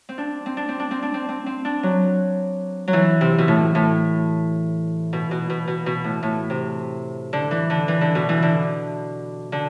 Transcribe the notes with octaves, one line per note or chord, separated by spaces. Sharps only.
C4
D4
C4
D4
C4
D4
C4
D4
C4
C4
C4
D4
F#3
F#3
E3
C3
B2
A2
A2
B2
B2
B2
B2
B2
A2
A2
C3
D3
E3
D3
E3
D3
B2
E3
D3
D3